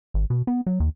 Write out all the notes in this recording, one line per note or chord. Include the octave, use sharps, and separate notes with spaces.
G#1
B2
B3
F#3
D#2